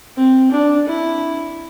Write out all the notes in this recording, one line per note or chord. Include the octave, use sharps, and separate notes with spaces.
C4
D4
E4